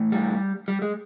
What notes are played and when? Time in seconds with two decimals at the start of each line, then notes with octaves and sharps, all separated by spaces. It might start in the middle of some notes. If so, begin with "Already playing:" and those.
Already playing: A2 E3
0.12 G3
0.68 G3
0.82 G#3